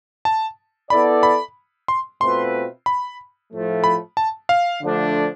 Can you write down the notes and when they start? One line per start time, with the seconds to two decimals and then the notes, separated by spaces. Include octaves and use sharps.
0.25 A5
0.90 B3 E4 A4 D5 B5
1.23 B5
1.88 C6
2.21 B2 A3 C4 F4 B4 C6
2.86 B5
3.52 A2 F3 A3
3.84 B5
4.17 A5
4.49 F5
4.81 D3 F3 A3 D4